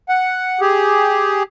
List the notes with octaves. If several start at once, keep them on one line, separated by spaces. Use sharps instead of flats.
F#5
G4 G#4